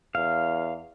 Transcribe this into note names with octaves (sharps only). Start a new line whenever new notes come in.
E2 F5